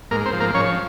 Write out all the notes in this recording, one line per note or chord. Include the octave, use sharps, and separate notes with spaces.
G#2 A#3 A#4
C4 C5
F3
A#3 A#4
F3 C#4 C#5